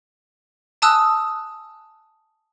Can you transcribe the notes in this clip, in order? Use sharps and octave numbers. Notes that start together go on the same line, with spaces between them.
G#5 A5 D#6 E6 F#6